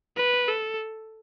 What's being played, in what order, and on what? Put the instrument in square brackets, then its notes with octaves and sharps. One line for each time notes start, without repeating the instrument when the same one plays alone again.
[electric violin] B4
A4